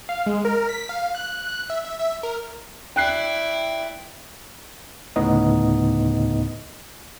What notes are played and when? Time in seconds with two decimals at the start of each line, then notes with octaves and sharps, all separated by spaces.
0.09 F5
0.27 G#3
0.45 A#4
0.69 B6
0.89 F5
1.15 F#6
1.47 F#6
1.70 E5
1.85 E5
1.99 E5
2.23 A#4
2.96 E4 D5 G5 F#6 C7
5.16 D2 A2 C#3 B3 D#4 D#5